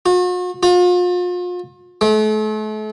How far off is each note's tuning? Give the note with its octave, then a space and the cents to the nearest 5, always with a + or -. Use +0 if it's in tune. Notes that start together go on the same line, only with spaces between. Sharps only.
F#4 -45
F4 +40
A3 -40